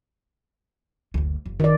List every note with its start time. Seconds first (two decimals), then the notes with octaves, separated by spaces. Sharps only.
1.14 F#1 D2
1.46 F#1
1.60 D#3 D5